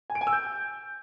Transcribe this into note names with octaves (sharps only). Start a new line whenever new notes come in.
G#5
D7
G#5
E6
G6